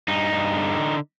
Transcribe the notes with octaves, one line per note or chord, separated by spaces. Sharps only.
G2 D#4
G2
D3